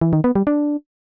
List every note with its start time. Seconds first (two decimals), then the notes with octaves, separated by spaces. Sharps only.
0.01 E3
0.13 D#3
0.24 B3
0.35 G3
0.47 D4